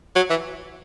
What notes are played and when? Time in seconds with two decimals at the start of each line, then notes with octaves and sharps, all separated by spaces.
0.16 F#3
0.30 E3